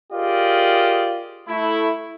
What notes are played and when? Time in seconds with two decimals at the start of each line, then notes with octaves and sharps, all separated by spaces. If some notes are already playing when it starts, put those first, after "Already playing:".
0.13 F4 G4 G#4 A#4 D5 D#5
1.49 A3 E4